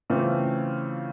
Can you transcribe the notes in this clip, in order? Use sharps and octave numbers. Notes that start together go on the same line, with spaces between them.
C#3 E3 A3 C4 F4